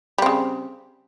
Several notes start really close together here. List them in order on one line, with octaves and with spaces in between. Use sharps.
G3 C4 C#3